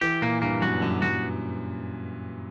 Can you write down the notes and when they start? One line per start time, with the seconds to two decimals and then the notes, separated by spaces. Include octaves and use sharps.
0.01 E3 G4
0.22 A#2 A#3
0.42 G2 A#3
0.62 F#2 F#4
0.82 F#2 D3
1.02 F#2 F#4